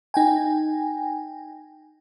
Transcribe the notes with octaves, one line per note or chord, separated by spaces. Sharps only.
D#4 G5 G#5